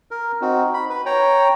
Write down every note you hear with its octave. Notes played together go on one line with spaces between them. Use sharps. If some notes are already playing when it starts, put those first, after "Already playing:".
A#4
C4 D#4 F#4
B5
B4 B5
C#5 G5 A#5